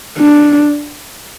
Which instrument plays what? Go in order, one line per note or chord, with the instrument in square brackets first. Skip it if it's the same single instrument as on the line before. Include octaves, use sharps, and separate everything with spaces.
[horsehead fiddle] D4